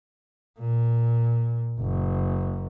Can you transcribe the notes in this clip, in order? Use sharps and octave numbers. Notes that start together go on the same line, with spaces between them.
A#2
F#1